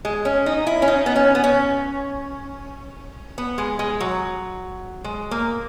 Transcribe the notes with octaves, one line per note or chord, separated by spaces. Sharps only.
G#3
C#4
D#4
E4
C#4
D#4
B3
C#4
B3
C#4
B3
G#3
G#3
F#3
G#3
A#3